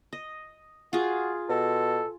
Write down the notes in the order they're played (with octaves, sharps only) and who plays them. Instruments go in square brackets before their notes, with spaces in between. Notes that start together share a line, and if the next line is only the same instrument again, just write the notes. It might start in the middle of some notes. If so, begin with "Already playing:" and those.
[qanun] D#5
[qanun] F4 G#4 [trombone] F#4
[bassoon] B2 [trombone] A4